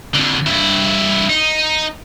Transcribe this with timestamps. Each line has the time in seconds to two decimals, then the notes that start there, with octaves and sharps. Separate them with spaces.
0.15 F2 D3
0.47 G2 E4
1.29 D#4